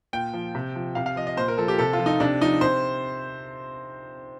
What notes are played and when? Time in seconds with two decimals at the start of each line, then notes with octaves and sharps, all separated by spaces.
0.13 A#2 G5
0.33 F3
0.55 C3
0.75 F3
0.95 C3 F5
1.06 F5
1.16 F3 D#5
1.27 D#5
1.37 A#2 C5
1.48 A#4
1.58 F3 A4
1.68 G4
1.79 C3 A4
1.93 F4
1.99 F3
2.06 D#4
2.20 C3 D4
2.41 F3 D#4
2.61 C3 C5